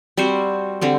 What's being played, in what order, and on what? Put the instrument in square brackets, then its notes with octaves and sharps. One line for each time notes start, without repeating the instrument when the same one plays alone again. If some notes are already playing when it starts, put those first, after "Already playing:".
[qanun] G3 C4 F#4 C5
D3 G3 C4